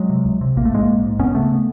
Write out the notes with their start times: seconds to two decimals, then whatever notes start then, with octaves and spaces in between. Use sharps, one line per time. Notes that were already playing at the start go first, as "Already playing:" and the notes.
Already playing: F#3 G#3
0.10 C3
0.25 C#2
0.41 C3
0.56 A#1 A#3
0.65 A3
0.72 G#2 G#3 A#3
0.88 A#1
1.03 G#2
1.19 C#2 B3 C#4
1.35 C#3 A3 B3